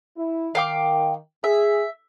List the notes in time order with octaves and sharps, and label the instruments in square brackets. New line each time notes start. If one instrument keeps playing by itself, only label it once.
[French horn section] E4
[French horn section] D#3 [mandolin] F5 G5 D6
[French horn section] G#4 [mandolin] E5